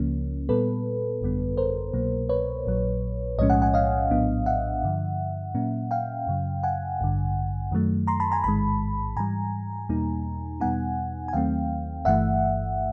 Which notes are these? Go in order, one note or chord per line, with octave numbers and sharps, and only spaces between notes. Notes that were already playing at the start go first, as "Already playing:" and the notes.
Already playing: C#2 C#3 F3 A#3 C#4
A#2 G3 B3 A4 B4
G#1 F#2 D3 G3 B3
A#4 C5
C2 B2 F#3 A#3
B4 C#5
A#1 A#2 F#3
B1 A2 F3 G#3 C#4 C#5 D#5
F#5 G#5
F#5 G#5
D#5 F5
A#1 A2 F#3 B3 D4
E5 F#5
G2 D3 F3
A#2 F#3 A#3 C#4
F5 G5
F#2 C#3 F#3
F#5 G#5
A1 G2 D3
F#2 D#3 F#3 A3
A#5 C6
A5 B5
G#5 A#5
A1 G#2 D#3 G#3 A5 B5
G#2 E3 G3 G#5 A#5
E2 B2 G3 A#3 D#4
E2 B2 G3 B3 D#4 F#5 G#5
G#5
D#2 D#3 F#3 A3 C4 F5 G5
G1 G2 E3 A3 E5 F#5